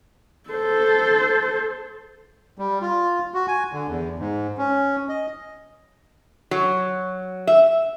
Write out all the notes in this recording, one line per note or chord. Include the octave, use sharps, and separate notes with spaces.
A4 C5
G3
F4
F#4
G#5
D3
E2
G#2
C#4
D#5
F#3
E5